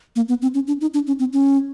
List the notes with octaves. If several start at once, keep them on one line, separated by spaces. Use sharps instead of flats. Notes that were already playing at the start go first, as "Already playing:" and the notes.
A#3
B3
C4
C#4
D4
D#4
D4
C#4
C4
C#4